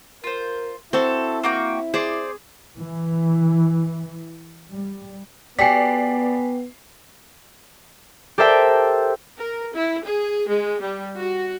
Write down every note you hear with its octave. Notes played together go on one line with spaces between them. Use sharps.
F4 A#4 C5
C4 E4 F#4 A4
A#3 F#4 G5
G#4 C5 D5
E3
G3
B3 F#4 G4 A4 D5 G#5 B6 C7
G4 A4 A#4 C5 E5 G5
A#4
E4
G#4
G#3
G3
F#4